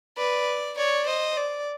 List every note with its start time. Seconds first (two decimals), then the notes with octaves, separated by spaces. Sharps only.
0.17 B4 D5
0.77 C#5 D5
1.06 C5 D#5
1.37 D5